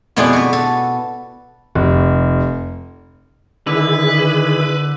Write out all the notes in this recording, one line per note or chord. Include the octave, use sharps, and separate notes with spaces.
F2 B2 B3 E4 G#4 D5
F#4 B4
A4
F1
D3 D#3 E4 G#4 B4